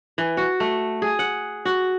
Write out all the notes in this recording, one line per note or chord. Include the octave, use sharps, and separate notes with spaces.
E3
F#4
A3
G#4
F#5
F#4